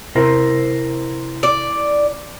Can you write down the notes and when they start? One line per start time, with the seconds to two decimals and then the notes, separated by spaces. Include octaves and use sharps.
0.15 C3 E4 A#4 C5
1.43 D5